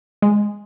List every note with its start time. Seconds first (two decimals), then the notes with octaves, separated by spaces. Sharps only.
0.22 G#3